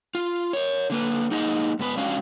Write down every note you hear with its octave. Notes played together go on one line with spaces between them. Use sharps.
F4
A#4 C#5
D3 A#3 B4
A#3 D#4 G#4 D#5 F#5
G#2 B3 B4
G#3 C#4 D4 F#4 F5